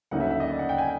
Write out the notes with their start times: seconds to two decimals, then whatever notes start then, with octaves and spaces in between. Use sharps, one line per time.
0.11 D2 C#3 F#3 A#3 D#4 F#5
0.21 E5
0.31 E5
0.40 D#5
0.50 D5
0.59 F#5
0.69 G5
0.78 G#5